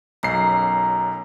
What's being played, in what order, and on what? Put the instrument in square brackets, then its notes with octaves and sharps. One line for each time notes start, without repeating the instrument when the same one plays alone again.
[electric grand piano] B1 F#2 C7 [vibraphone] A#5